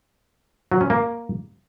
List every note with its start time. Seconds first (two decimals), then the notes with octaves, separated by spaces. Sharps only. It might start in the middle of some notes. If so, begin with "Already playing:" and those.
0.72 F#3
0.81 C#4
0.90 A#3